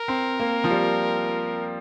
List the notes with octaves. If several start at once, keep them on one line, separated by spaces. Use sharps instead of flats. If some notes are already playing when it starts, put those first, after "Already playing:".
Already playing: A#4
C4
A#3
F3
G3